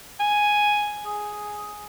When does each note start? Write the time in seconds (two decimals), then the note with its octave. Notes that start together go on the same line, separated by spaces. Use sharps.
0.20 G#5
1.06 G#4